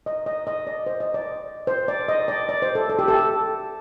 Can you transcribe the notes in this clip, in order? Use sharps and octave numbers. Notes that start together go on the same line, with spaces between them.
D#5
D#5
D#5
D5
C5
D#5
D5
C5
D5
D#5
D5
D5
C5
A4
A4
G4
A4